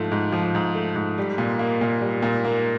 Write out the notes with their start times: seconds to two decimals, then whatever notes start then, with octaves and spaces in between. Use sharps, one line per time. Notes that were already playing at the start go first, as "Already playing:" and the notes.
Already playing: G#2 F3 A3
0.12 G#2
0.32 F3
0.55 G#2
0.75 A3
0.96 G#2
1.18 G3
1.38 A#2
1.59 A#3
1.81 A#2
2.01 G3
2.22 A#2
2.45 A#3